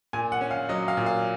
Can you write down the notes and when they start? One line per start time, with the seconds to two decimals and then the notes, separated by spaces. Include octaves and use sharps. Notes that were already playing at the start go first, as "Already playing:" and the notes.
0.13 A#2 G#5
0.32 F#5
0.41 C#4
0.51 F5
0.69 F#3 D#5
0.88 F5
0.97 A#2
1.06 F5